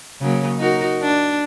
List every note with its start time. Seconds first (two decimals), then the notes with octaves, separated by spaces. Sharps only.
0.21 C#3 F#3 A#3
0.59 D#4 F#4 A#4
1.01 D4